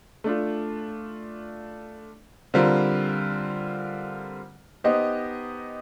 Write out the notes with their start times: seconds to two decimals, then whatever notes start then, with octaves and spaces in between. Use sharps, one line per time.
0.24 A3 D4 F4
2.54 D3 G3 C4 F4 A#4
4.84 B3 D#4 G4 C5 D#5